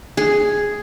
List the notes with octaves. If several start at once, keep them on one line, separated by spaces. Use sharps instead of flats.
G#4